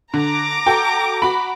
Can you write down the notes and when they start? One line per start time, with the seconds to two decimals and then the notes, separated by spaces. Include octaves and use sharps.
0.14 D3 A#5 D6
0.66 F#4 A4 G5
1.22 F#4 B5